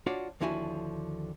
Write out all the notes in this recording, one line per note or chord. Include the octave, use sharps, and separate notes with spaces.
D4 F4 F#4 C#5 D5
D#2 D3 F3 E4 F#4 G#5